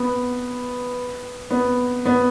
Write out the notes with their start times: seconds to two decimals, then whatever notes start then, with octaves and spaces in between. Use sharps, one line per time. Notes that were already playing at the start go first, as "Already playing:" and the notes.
Already playing: B3
1.51 B3
2.06 B3